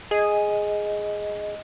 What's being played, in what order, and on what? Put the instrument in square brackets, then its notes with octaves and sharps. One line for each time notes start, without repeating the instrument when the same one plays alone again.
[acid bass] G#4 [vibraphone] D#5